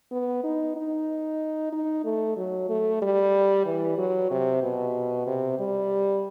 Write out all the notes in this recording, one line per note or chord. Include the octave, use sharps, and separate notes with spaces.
B3
D#4
D#4
D#4
A3
F#3
A3
G3
E3
F#3
C3
B2
C3
G3